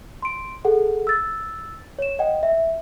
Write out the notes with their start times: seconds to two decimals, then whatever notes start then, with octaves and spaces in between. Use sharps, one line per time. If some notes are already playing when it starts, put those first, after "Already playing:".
0.22 C6 D7
0.65 G#4 A4 F#5
1.07 E6 A6
1.99 C#5 E7
2.19 D#5 F#5 G5
2.43 E5